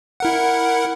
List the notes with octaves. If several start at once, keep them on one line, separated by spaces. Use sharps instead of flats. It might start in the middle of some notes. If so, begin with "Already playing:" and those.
E4 A#4 F#5